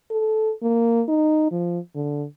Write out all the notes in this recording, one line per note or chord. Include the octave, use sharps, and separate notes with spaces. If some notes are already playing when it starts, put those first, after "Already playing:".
A4
A#3
D#4
F3
D3